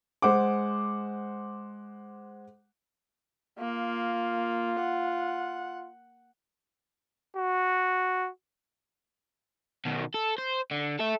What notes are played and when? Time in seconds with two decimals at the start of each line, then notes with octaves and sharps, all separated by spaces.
0.22 G#3 C5 F#5 D6
3.59 A#3 F4
4.80 F#5
7.37 F#4
9.85 B2 D#3
10.14 A4
10.38 C5
10.71 D3
10.99 A4 E5